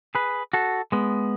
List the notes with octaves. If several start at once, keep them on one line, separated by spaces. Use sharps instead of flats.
G#4 B4
F#4 A4
G#3 B3